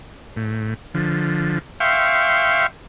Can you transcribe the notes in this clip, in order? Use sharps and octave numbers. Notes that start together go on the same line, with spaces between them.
A2
D3 F3
E5 F5 G5 C6 C#6